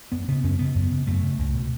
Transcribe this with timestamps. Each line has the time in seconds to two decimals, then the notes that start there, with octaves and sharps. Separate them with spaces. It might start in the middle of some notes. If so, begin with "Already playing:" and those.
0.12 F#2 B3
0.28 C#3 B3
0.44 F#2 C#4
0.59 C#3 B3
0.75 F#2
0.92 C#3
1.07 F#2 A3
1.23 C#3
1.39 C#2
1.54 B2